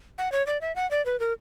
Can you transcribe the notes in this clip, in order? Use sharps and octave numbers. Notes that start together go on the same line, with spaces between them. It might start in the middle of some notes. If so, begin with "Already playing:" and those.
F#5
C#5
D5
E5
F#5
D5
B4
A#4